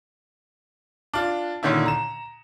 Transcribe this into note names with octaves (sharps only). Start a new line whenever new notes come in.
D4 F4
A#2 D3 D#3 C#4 E4
A#5 E7